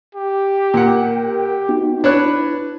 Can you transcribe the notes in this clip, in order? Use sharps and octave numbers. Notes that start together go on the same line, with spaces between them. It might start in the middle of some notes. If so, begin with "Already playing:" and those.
G4
A#2 A#4 F#5 G5
G4
B3 D#4 F#4
D4 E4 B4 C#5 F#6